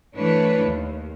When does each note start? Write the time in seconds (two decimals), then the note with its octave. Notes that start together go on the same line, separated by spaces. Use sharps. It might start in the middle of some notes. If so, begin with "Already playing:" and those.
0.16 E3 A3 D4 B4 C#5
0.65 D#2